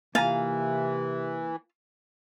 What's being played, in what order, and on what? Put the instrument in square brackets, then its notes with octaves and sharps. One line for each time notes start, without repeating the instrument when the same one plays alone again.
[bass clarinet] C3 [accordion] E3 [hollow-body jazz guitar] A#3 G#5 A#5 [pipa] F4 F5